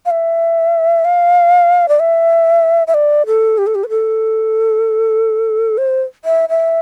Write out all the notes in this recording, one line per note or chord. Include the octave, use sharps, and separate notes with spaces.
F5
E5
F5
D5
E5
E5
D5
A4
G4
A4
G4
B4
A4
C5
E5
E5